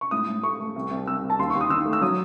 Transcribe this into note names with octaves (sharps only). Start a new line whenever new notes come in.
C#6
A2 D#6
A2
A3 C#6
A3
C2
C2
C2 E6
C2
A5
D#2 C6
D#2 C#6
D#6
D#3 E6
A3
E6
F#3 D#6